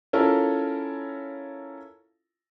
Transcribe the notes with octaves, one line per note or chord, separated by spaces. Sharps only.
C#4 E4 F4 A4 A#4